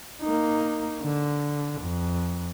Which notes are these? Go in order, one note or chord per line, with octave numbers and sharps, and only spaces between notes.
A#3 D#4
D3
F2